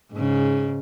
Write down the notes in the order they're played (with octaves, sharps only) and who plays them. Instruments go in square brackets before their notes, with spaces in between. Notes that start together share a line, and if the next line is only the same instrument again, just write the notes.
[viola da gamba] G#2 C#3